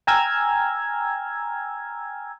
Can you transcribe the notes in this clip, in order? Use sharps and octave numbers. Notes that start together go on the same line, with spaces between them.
G5 G#5 A#5 E6 F6 G#6